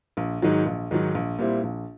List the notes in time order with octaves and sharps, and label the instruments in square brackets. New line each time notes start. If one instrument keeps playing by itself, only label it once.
[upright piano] A#1
G#2 D#3 F#3
A#1
G#2 D#3 F#3
A#1
A#2 G3 C4 E4
A#1